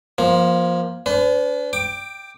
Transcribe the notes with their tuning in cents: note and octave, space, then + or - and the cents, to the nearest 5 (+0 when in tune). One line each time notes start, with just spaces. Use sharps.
F3 +0 A#3 +30
D4 -35 B4 +35
G5 +0 D6 +20